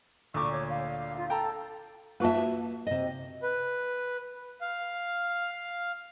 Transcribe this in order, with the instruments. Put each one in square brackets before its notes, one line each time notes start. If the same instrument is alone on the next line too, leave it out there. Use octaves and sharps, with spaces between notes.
[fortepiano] D2 A#2 D6 [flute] C#6
[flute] C#5
F5
F4
[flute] A4 [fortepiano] G5 A5 A#5
[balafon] A#3 F4 A5 [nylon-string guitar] B4 E5
[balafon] F4 F#4
[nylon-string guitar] C3 D#5
[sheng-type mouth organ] B4
F5